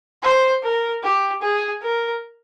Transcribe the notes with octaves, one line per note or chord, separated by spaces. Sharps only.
C5
A#4
G4
G#4
A#4